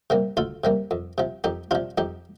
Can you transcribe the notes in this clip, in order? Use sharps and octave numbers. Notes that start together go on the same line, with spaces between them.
C3 G3 A#3
D2 F4 A4
C3 G3 A#3
F2
C3 F3
F2 D#4 G4
C3 F3 D4 F4
F2 D#4 G4